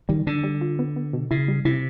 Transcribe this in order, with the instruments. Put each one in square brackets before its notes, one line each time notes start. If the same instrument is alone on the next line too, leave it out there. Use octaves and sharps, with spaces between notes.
[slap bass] D#3 [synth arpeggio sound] G3
[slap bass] D3 [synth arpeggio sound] D4
[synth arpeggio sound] G3
F4
B3
B3
B2
[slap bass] C#3 [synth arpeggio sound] E4
[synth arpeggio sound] G3
[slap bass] C3 [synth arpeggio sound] E4